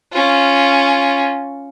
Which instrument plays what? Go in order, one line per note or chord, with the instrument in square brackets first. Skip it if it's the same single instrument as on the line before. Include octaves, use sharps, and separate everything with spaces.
[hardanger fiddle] C#4 F4